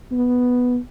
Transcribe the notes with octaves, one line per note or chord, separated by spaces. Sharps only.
B3